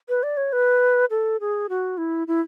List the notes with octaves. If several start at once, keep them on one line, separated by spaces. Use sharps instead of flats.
B4
D5
C#5
B4
A4
G#4
F#4
E4
E4